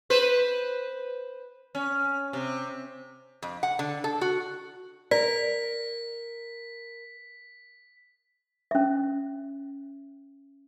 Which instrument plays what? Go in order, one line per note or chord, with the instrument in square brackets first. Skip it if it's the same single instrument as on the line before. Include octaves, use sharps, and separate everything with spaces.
[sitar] B4 C5
C#4
C3
[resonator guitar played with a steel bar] F2
F#5
D3
A4
F#4
[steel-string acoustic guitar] A#4 [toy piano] D5 [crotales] B6
[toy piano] C#4 E5